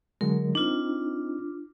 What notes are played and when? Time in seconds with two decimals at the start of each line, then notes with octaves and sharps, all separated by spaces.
0.21 D3 F#3 G#3 A#4
0.55 C4 D4 D#4 F4